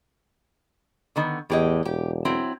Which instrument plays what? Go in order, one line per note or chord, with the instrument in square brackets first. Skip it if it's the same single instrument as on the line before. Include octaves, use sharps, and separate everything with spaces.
[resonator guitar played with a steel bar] D3 D#3 B3
[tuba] E2 [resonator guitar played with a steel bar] A2 G4 D#5
[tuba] E1 [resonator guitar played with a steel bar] G4
[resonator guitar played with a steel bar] F#3 C4 E4